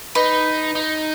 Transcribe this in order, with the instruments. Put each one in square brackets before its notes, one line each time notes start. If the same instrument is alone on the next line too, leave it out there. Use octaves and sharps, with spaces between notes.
[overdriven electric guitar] D#4 [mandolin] B4
[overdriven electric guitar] D#4